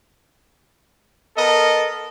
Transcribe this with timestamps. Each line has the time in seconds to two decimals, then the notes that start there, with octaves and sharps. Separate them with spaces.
1.37 B3 A4 A#4 D#5